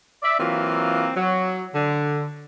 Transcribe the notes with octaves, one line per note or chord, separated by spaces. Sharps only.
D5 E5
E3 F#3 A#3 C4 F4
F#3
D3